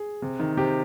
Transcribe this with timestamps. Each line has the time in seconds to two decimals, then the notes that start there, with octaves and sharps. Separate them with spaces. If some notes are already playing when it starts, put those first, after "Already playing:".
Already playing: G#4
0.22 C3
0.40 D#3
0.57 C3 G4